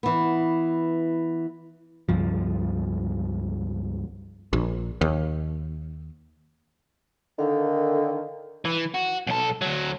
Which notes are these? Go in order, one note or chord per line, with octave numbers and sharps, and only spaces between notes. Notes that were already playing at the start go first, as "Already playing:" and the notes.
E3 B3
C#2 G2 F3
A#1
D#2
D3 D#3 A4 A#4 F5
E3
F#4
B1 A4
D2 F#3